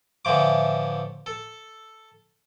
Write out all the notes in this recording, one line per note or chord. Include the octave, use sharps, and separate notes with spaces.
A2 D3 E3 F3 D6
A4